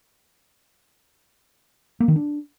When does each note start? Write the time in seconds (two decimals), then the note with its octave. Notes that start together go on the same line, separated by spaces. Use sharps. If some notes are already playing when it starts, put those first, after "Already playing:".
2.00 A#3
2.08 D#3
2.16 D4